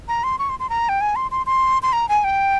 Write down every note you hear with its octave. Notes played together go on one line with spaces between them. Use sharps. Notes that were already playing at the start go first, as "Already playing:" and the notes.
A#5
C6
C#6
C6
C6
A#5
G5
G#5
C6
C6
C6
C6
A#5
G#5
G5